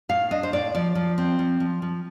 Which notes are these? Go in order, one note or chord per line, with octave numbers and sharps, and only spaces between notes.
A2 F5
D4 D#5
C5
A2 D5
F3 D5
F3
C4
F3
F3
F3